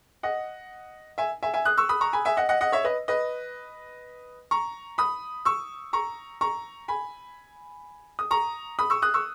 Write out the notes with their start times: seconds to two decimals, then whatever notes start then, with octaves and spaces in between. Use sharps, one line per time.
0.23 D#5 F#5
1.18 E5 G#5
1.43 E5 G#5
1.54 E5 G#5
1.65 D#6 F#6
1.78 C#6 E6
1.89 B5 D#6
2.01 A#5 C#6
2.13 G#5 B5
2.25 E5 G#5
2.37 D#5 F#5
2.49 D#5 F#5
2.61 D#5 F#5
2.72 C#5 E5
2.84 B4 D#5
3.08 B4 D#5
4.51 A#5 C#6
4.98 B5 D#6
5.45 C#6 E6
5.93 A#5 C#6
6.41 A#5 C#6
6.88 G#5 B5
8.19 D#6
8.31 A#5 C#6
8.79 B5 D#6
8.90 C#6 E6
9.02 D#6 F#6
9.14 C#6 E6